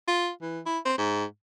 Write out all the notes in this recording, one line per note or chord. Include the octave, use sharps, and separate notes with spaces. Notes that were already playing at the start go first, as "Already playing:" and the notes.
F4
E3
E4
C4
G#2